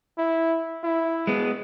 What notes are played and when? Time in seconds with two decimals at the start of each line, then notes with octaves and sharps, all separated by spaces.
0.18 E4
0.84 E4
1.27 G#3 B3